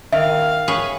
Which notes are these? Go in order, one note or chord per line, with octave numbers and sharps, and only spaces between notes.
D#3 E5 F5
G#4 B4 C#5